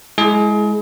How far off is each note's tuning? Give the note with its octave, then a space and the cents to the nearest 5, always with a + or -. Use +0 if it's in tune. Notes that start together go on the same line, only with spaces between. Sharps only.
G#3 +10 E4 +0 G#4 +30